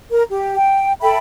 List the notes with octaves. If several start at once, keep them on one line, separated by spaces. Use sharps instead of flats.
A#4 A#5
G4
G5
A4 E5 G5 B5